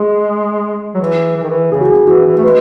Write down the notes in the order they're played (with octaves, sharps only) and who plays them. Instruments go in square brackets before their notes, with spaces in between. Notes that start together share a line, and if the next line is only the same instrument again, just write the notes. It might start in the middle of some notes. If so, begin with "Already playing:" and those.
Already playing: [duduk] G#3 [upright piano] G#4
[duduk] F#3
E3
E3
D#3
E3
[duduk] C#3 [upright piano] G#4
[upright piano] F#4
G#4
[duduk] E3 [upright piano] F#4
[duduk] E3
A3
[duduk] G#3 [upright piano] B4